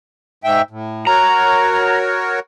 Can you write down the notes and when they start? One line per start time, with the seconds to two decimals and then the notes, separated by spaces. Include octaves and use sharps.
0.44 G#2 E5 G5
0.71 A2
1.07 F#4 A#4 C#5 A#5